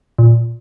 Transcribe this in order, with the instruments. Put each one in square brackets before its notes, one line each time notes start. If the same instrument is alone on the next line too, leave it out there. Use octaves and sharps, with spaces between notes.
[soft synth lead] A#2